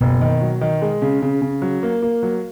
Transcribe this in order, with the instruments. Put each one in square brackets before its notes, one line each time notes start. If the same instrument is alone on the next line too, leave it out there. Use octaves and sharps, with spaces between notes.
[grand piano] F#1 [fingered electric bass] B2 B3
[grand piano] D#3
F#3
D#3
G#3
C#3
C#3
C#3
F#3
A#3
A#3
F#3